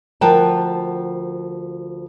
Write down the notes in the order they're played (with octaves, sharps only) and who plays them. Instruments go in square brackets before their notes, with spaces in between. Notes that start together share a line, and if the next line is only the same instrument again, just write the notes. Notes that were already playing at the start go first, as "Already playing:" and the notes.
[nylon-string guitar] D2 F3 A#4 F#5 G5 A5